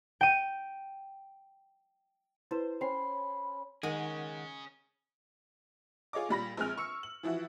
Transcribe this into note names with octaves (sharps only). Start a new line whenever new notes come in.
G5 D#7
E4 B4 C5
C#4 C5 G5 B5 C6 C7
D#3 G#3 C#4 G#4 A#4 F#5
F4 G#4 C#5 D#5 D6
A#2 G3 B5 A#6
A#1 G#3 C4 G#5 F6 F7
C#6 E6 C#7
F#7
E3 F3 E4 F#4